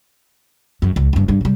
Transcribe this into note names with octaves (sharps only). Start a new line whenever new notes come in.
F#2 F3
C#2
F#1 G2
G2
C3 G3